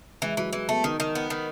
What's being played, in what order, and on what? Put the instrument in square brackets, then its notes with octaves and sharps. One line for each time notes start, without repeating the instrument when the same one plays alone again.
[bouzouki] E3 [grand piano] G#3
[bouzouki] E3 [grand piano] F#3
[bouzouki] E3 [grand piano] G#3
[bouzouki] A3 [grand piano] B3
[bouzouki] D#3 [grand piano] D#4
[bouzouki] D#3
B3
D#3